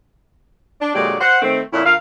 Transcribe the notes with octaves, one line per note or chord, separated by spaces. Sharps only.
D4
A#2 D3 F#3 G#3 G4 D5
C5 F#5
D#3 A3 C4
F2 A#2 C#4 E4
D2 F4 A#4 F5